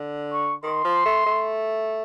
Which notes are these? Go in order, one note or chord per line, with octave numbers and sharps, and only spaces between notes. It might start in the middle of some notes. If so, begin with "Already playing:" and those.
Already playing: D3
C#6
D#3 C6
F3
A3
A3